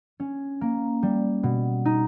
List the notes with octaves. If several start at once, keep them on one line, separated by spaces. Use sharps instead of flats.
C#4
A#3
G3
B2
D#4